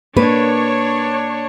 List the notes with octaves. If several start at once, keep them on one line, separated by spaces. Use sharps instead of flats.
A#3 D4 B4 C#5